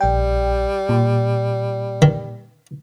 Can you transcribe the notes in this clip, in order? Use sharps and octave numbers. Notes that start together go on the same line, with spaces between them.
A#1 G3 G5
A#2
D#3